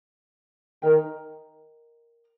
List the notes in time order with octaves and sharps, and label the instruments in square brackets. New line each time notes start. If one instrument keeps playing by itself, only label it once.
[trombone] D#3 [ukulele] A#4 D#5 G5 A#5